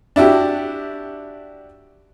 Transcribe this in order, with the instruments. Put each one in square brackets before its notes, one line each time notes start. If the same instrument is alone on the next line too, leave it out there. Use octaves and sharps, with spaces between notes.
[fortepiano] D4 E4 F#4 G4